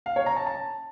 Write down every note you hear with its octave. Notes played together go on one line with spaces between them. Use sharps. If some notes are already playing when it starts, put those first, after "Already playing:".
F5
C#5
A#5
A5
A5